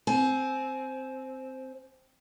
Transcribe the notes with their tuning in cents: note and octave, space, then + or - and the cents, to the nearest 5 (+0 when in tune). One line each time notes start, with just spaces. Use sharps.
C4 +0 G#5 +30